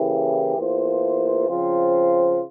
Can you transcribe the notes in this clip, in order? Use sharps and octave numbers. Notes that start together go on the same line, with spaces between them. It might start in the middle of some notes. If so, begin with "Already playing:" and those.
Already playing: C#3 E3 A#3 E4 G4
E2 E3 A#3 F4 C5
C#3 F3 C4 F4 C5